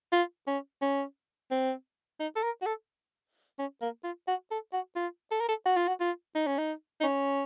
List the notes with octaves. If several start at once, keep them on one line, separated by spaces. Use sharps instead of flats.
F4
C#4
C#4
C4
D#4
A4
A#4
F#4
A4
C#4
A#3
F4
F#4
A4
F#4
F4
A4
A#4
A4
F#4
F4
F#4
F4
D#4
C#4
D#4
D#4
C#4